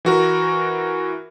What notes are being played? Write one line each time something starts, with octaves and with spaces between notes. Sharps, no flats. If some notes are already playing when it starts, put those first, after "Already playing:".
E3 F#4 A#4